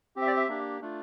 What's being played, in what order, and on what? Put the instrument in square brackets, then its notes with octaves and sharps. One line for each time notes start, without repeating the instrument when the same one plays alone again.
[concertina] C4 G4
E5
D5
E5
A#3 D4 G4
A3 D4 F4